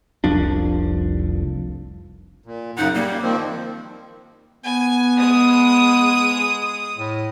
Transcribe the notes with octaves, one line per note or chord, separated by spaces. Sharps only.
F1 C2 F3 D4
A#2
F#2 C#3 D#4 F#5
G3 A#3
D#3 F3 C4
B3 G#5
G#3 D#6
A2